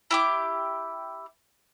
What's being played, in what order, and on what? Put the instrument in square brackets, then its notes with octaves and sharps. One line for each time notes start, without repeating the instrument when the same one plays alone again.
[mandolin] E4 G4 D6